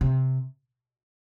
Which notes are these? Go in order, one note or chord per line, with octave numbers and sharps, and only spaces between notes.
C3